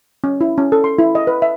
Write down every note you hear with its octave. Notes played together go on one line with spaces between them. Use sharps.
C#4
E4
C#4
A4
C6
E4
D#5
B4
E5